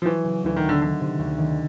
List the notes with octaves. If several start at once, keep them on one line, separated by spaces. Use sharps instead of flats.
F3
E3 F#3
C#3
D2 E3
D#3
B3
D3
D3 D#3
C3
D2
D#3